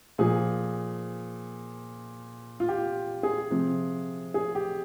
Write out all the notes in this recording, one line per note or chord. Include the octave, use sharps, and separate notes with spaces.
A#2 F3 G#4
F4
G4
G#4
C3 F3
G#4
G4